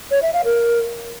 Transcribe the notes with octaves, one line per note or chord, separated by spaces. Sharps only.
C#5
E5
F5
A#4